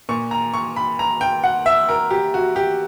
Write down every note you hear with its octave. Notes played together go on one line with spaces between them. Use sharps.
A#2 C#6
A#5
C#6
B5
A#5
G5
F#5
E5
A#4
G4
F#4
G4